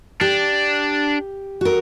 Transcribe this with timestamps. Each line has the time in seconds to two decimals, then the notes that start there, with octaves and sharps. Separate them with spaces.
0.21 D4 G4
1.61 F#4 A#4